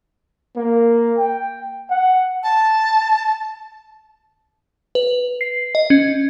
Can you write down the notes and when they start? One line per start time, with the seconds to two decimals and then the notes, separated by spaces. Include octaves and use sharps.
0.57 A#3
1.18 G5
1.90 F#5
2.43 A5
4.95 B4
5.41 C7
5.75 D#5
5.90 C#4